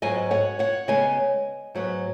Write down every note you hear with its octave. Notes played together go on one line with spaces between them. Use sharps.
G#2 F#3 B3 D#5 G#5
C#5 F#5
C#5 F#5
C#3 G#3 B3 D#5 G#5
G#2 F#3 B3